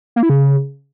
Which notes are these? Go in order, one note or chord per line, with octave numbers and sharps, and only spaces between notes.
A#3
E4
C#3